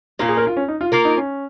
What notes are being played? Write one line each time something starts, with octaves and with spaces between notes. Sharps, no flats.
A#2 A#3 C#4 F4
G#4
A#4
F4
C#4
D#4
F4
A#3 F4 A#4
D#4
C#4